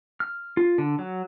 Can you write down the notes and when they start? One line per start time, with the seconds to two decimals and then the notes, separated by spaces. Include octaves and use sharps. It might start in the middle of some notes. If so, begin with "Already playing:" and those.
0.20 F6
0.57 F4
0.78 D3
0.99 F#3